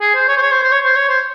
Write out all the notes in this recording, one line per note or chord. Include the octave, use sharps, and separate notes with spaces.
G#4
C5
C#5
C5
C#5
C5
C5
C#5
C5
C#5
C5